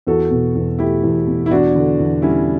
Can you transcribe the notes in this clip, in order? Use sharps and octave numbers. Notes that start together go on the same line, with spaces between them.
E2 F#4 A4
B2
E2
A3 E4 G4
E2
B2
E4
E2 D4 F#4
D3
E2
G3 C#4 E4